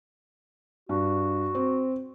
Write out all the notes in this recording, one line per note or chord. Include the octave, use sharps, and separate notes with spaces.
G2 F#4
C4